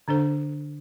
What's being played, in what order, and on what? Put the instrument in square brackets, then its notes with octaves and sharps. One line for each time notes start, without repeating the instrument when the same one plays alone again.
[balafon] D3 D4 A4 C5